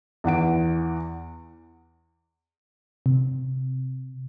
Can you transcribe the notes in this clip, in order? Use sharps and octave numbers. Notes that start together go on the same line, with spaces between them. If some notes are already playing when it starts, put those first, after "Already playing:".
E2 E3 F#5 D7
C3